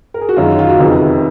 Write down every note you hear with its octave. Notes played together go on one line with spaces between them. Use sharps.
A#4
G#4
F#4
F#2 D#3 G#3 C#4 F4
F#4
F4
F#4
F1 F2 C3 D#3 G#4